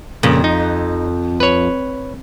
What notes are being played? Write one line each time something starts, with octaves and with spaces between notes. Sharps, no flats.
F2 A#2 C#3
D#4
B4 C#5